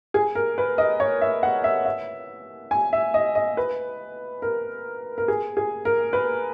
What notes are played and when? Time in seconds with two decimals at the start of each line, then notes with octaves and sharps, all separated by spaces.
0.14 G#4
0.35 A#4
0.58 B4
0.78 D#5
1.00 C#5
1.22 E5
1.43 F#5
1.64 E5
1.85 E5
2.71 G#5
2.93 E5
3.14 D#5
3.35 D#5
3.57 B4
4.42 A#4
5.18 A#4
5.28 G#4
5.57 G#4
5.85 A#4
6.13 B4